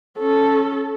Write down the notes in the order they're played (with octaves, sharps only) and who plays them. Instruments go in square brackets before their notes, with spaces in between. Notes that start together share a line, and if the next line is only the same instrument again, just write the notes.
[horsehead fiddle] C#4 A4